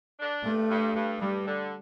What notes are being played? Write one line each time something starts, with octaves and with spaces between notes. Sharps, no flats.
D4
G2 A3
G2
G2
G2 G3
D3